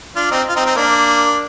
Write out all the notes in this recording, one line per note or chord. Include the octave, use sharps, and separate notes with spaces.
D4 F4
C4 D#4
F4
C4 D#4
C4 D#4
A#3 D4